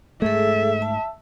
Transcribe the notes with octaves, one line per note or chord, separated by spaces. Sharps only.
G#2 A3 G#4 A4 E5
A5